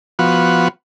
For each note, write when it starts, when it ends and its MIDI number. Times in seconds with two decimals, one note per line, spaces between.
0.19 0.68 53
0.19 0.68 59
0.19 0.68 66